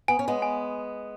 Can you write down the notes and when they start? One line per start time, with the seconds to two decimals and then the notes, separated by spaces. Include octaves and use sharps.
0.08 B3 G#5
0.19 C#4
0.28 G#3 B3
0.42 G#5